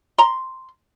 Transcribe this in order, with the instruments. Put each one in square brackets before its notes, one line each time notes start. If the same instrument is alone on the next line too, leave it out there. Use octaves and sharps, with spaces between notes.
[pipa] A#5 C6